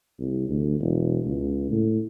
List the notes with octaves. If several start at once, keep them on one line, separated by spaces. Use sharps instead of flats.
C2
D2
E1
C#2
A2